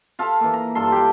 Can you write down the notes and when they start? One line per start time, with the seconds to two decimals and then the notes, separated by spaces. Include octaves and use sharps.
0.19 F4 A4 E5 F5
0.41 E3 A#3
0.54 A#5
0.75 G2 F4 A4 C6
0.92 G4 A4 F5 G5